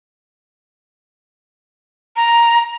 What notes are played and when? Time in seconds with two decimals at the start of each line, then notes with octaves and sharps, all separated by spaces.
2.16 A#5